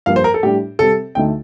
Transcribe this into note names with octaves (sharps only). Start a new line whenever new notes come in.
G2 F3 A#3 F5
C5
A#4
A4
A2 G3 D4 G4
C3 G3 C4 A4
D2 D3 A3 D#4 G5